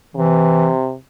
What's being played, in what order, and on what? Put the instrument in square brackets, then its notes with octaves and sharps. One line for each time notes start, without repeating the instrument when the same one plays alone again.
[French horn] C3 [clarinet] E3